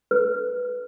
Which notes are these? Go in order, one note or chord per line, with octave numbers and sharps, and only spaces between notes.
B4